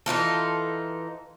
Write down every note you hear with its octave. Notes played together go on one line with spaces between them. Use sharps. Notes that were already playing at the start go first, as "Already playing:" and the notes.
E3 D#4 F4 A4